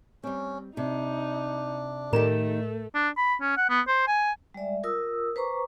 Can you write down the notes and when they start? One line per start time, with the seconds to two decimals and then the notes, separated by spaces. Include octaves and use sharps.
0.24 G3 C4 C#4
0.77 C3 D4 D#4
2.13 A2 D#3 A3 D#4 G4 A4 A#4 E7
2.95 D4
3.17 B5
3.41 C#4
3.57 F#5
3.70 B3
3.88 C5
4.07 G#5
4.54 G3 G#3 D5 E5
4.83 F4 A#4 D#6 E6
5.36 B4 C5 A#5 C#6 D6